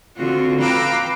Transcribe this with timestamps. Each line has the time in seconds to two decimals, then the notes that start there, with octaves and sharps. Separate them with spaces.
0.17 D3 C4 F4 F#4
0.59 B4 F5 G5 A#5 D6 E6